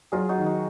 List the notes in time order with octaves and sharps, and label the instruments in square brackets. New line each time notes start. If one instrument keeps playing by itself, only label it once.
[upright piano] F#3 [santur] F4 G#4
[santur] D#4 F#4
[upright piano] D#3
[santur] D#4